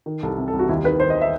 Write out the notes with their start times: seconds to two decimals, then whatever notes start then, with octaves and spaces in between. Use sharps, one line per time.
0.06 D#3
0.23 C2 A4
0.38 C3
0.48 A4
0.53 C2
0.59 F#4
0.69 D#2 E4
0.84 D#3 B4
1.00 D#3 C5
1.10 D#5
1.21 E5